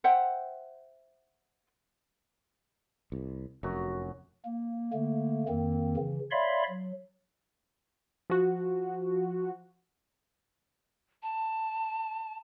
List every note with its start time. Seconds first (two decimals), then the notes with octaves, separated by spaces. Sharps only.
0.04 C5 E5 F#5 G5
3.12 C2
3.63 F1 F#2 F#4
4.45 A#3
4.93 D3 A3 A#3
5.49 F2 D#3 A#3 C4
5.97 C#3 E3
6.31 C#5 D5 E5 F5 B5 C6
6.68 F#3
8.30 F3 F#4
11.23 A5